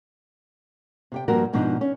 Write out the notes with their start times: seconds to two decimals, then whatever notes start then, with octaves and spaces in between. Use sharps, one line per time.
1.12 C3 G4 G5
1.28 G2 F3 A#3 F#4 G4 A#4
1.53 G#2 B2 F3 D4 D#4
1.81 C#4